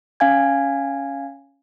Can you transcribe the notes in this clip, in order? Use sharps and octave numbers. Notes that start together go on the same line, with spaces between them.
C#4 F5 G#5 G#6